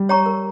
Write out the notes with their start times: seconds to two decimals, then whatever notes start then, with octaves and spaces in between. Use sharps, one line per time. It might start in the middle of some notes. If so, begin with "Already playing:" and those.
Already playing: G3
0.09 C#5 G5 A#5 C#6
0.26 A#4